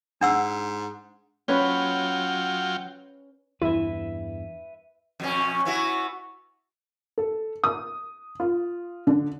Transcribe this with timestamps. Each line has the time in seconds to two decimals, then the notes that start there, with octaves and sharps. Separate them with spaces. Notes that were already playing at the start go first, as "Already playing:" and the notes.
0.21 G#2 D4 F#5 E6
1.48 F#3 C#4 F4 B4 C#5 G5
3.62 E2 G2 E3 E4 B4 E5
5.20 F2 B2 C#4
5.65 B3 E4 F#4
7.18 A4
7.64 D#6
8.40 F4
9.07 D3